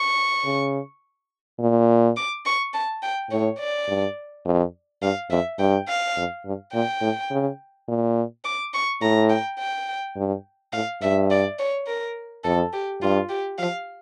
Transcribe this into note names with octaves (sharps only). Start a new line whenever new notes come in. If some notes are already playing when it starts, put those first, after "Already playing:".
Already playing: C#6
C#3
A#2
D6
C#6
A5
G5
A2 C#5
D5
G2
F2
G2 F5
F2 E5
G2 G5
F5
F2
G2
A#2 G5
A2
C#3
A#2
D6
C#6
A2 A#5
G5
G5
G2
A2 F5
G2 E5
D5
C#5
A#4
F2 A4
G4
G2 F4
G4
F3 F5